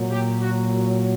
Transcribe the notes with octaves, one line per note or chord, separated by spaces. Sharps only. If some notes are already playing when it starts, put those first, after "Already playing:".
Already playing: A#2 F#3
G4
F#4